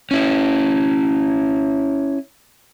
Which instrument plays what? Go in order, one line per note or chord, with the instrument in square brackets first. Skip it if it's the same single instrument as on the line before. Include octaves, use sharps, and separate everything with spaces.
[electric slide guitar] C#4 E4